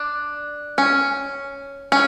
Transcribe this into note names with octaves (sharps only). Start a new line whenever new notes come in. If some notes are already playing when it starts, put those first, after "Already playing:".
Already playing: D4
C#4
C#4